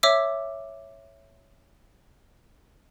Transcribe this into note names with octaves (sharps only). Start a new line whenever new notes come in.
C#5 E5 D6 E6